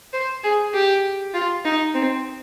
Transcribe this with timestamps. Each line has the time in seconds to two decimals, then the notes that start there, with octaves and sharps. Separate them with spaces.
0.13 C5
0.44 G#4
0.74 G4
1.34 F4
1.65 D#4
1.95 C4